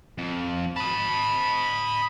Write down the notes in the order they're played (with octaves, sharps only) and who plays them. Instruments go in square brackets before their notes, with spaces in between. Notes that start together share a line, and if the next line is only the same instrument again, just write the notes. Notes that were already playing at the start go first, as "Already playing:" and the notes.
[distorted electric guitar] F2
[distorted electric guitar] D#5 A5 [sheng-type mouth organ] B5